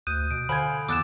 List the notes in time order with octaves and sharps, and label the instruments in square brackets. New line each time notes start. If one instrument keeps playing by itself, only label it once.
[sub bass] D2 [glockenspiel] D#6 F#6 G6 [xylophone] D#7
[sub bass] B2 [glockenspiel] D7
[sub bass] D3 [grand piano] C5 F5 G#5 [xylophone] B5 G#6
[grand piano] E2 [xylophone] D6 F#6 E7 [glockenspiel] E6 A6